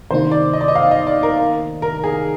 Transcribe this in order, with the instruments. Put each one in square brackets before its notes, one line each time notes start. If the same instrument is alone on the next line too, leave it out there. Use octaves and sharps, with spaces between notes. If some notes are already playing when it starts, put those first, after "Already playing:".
[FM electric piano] C3 D#3 A#3 D#4 [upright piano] C5
[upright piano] D5
D#5
D5
D#5
F5
D#5
D5
A#4
A#4
G#4